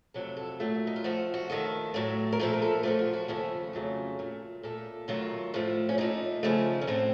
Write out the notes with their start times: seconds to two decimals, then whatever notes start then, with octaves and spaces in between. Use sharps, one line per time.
0.14 F2 C3 F#3 A3 A4
0.37 A4
0.59 A#2 F#3 A3 A4
0.87 D#4
0.96 F4
1.04 F#2 F3 A3 F#4
1.34 F#4
1.50 D#2 D#3 A3 A4
1.94 A2 F#3 A3
2.32 A#4
2.39 A#2 F3 A3 A4
2.53 A#4
2.62 A4
2.83 F#2 F3 A3 F#4
2.99 F4
3.13 F#4
3.28 D#2 C#3 F3 A3 A4
3.73 F2 C#3 F#3 A3
4.19 A#2 A3
4.63 A#2 A3 A4
5.08 D#2 D#3 F#3 A3 F4
5.54 A2 F3 A3
5.89 C#4
5.98 A#2 A3 D#4
6.43 D#2 C#3 F3 A3
6.81 C#4
6.87 A2 A3 C4